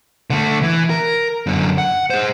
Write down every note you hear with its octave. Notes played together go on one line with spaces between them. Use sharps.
D3 A3
E3
A#4
F#2 D3
F#5
G#4 C5